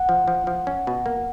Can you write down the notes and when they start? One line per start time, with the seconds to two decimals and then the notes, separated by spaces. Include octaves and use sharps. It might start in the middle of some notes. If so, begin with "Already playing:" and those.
Already playing: F#5
0.09 F3
0.28 F3
0.47 F3
0.67 C#4
0.87 B2
1.06 A#3